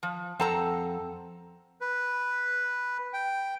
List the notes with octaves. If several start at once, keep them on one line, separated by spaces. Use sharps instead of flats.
F3
F2 C4 A4 F#5 A5 A#5
B4
G5